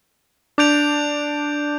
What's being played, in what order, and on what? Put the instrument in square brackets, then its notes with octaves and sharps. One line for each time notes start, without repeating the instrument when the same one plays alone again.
[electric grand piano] D4 [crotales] D6 G6 D7 F7